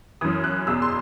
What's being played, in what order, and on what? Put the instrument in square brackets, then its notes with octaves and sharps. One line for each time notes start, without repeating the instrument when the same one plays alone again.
[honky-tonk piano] F#2 E3 D#6
F#6
E2 B2 E6
C6